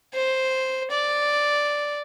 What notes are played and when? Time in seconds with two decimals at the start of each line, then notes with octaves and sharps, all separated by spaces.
0.14 C5
0.91 D5